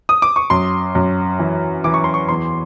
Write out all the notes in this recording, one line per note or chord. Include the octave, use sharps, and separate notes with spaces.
D#6
D6
C#6
F#2 C6
F#2
E3
E3 D6
C#6
C6
C#6
E2 C6